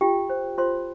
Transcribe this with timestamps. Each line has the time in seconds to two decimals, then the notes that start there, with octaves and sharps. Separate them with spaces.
0.01 F4 G4 G5
0.30 C5
0.58 F4 C5 C6